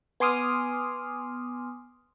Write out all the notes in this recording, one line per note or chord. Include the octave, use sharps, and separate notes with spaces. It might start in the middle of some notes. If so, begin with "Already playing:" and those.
B3 G#5 C6 D6 D#6 F6